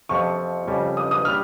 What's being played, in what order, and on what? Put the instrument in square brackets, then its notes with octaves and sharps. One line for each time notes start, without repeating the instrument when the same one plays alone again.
[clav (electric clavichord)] F2 C3 F3 [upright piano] C#6
[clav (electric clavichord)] F2 C#3 G3
[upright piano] D#6
D#6
[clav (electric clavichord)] G3 [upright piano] F6